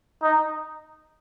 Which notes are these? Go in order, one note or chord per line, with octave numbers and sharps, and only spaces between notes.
D#4